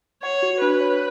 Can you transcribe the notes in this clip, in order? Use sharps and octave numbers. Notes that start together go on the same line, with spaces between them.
C#5 F#5
F#4
D4 B4
C#5